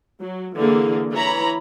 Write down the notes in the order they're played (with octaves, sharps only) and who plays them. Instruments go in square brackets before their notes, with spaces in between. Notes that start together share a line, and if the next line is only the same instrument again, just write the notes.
[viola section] F#3
D3 E3 A#3 G#4
E3 C#5 A#5 B5